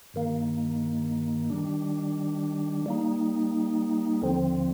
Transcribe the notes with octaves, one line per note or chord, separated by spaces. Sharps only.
G2 D#3 A#3
D#3 G3 D4
G3 A#3 D#4
D#2 D3 F3 C4